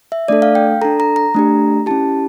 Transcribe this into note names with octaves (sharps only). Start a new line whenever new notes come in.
E5
A3 D4 A4 D5
F5
G5
D4 A4 A#5
A#5
A#5
A3 D4 G4
C#4 E4 G4 A5